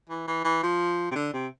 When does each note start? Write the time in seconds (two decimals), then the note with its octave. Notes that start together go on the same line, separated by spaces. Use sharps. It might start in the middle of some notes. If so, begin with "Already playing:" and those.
0.09 E3
0.27 E3
0.44 E3
0.63 F3
1.11 C3
1.15 D3
1.33 C3